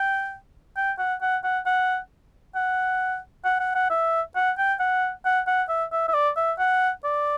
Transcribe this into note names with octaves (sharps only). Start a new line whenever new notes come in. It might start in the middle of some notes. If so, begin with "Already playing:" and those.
Already playing: G5
G5
F#5
F#5
F#5
F#5
F#5
F#5
F#5
F#5
E5
F#5
G5
F#5
F#5
F#5
E5
E5
E5
D5
E5
F#5
D5